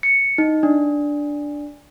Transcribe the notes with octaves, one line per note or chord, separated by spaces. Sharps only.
C#7
D#4
D4